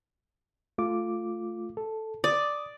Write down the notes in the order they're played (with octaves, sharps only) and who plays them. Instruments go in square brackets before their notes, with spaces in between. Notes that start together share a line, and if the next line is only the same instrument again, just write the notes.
[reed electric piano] A3 F4 D6
A4
[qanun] D5 [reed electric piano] D#6